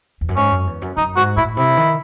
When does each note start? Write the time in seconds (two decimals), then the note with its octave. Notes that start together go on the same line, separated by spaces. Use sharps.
0.21 E2
0.29 F#2
0.36 G#2 C#4
0.51 F#2
0.67 E2
0.82 F#2
0.97 F#2 D#4
1.16 G#2 F#4
1.37 A2 E4
1.57 C3 E4
1.76 D#3